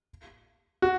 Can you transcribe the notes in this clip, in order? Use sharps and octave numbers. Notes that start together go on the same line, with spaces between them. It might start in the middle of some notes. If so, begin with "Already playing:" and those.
F#4